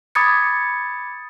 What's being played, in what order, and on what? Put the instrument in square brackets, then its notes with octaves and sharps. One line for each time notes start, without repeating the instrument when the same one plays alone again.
[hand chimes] B5 D6 D#6 G#6 A6 C#7